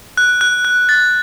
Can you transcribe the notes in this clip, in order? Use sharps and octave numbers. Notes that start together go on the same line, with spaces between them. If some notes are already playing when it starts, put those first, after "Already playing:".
F#6
F#6
F#6
A6